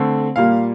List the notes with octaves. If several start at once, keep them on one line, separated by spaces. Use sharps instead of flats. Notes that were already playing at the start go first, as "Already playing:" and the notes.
Already playing: D3 A3 C4
A#2 G3 A#3 F5